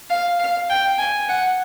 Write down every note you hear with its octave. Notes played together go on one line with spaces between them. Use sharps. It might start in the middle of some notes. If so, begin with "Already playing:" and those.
F5
F5
G5
G#5
F#5